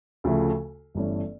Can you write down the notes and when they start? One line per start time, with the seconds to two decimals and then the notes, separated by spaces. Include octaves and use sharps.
0.24 D2 C#3 F3 A3
0.95 G1 G2 E3 A3 C#4